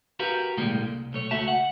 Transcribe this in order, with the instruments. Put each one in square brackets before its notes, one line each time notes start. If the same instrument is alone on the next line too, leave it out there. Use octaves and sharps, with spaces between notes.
[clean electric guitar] F#4 G4 A#4 B4 F5
B1 A2 D3 G3 G#3 A#3
C2
B1 A3 C#5
C#2 A3 F#4 E5 A5
F#5